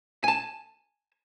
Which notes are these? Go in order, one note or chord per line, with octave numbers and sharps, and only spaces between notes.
G#5 A5